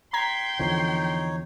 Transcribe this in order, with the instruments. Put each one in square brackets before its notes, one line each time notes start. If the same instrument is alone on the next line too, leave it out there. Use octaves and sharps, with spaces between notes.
[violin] G5 C6 [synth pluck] A#5 G#6 B6
[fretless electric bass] E2 D3 F3 [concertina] D#4 C#5